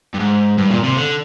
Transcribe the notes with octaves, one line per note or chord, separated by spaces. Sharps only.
G2
G#2
G2
A#2
C3
D3